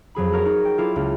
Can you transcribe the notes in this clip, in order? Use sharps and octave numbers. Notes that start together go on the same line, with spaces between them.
F2 F#3 G#4 B5
F#4 A#4 C#5 F#5
D#4
G5
E4 F4 A4 D6
C#2